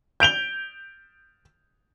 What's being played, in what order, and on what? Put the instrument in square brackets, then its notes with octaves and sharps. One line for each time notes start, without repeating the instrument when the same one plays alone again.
[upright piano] G6 D7 F7 G7